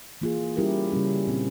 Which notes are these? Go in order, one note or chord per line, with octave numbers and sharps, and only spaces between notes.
E3 A#3 F4 G#4
G3 C#4 E4 G4 A#4
C#3 G3 C#4
A#2 G3 C4